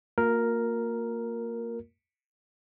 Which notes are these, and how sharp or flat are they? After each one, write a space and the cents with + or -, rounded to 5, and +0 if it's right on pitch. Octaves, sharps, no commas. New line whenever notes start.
A#3 -20 F4 +40 A#4 +0